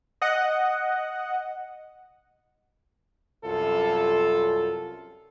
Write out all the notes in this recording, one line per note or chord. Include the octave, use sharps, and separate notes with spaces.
D#5 F#5
C2 F#2 F4 A4